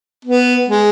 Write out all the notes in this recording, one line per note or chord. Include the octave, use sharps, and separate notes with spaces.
B3
G#3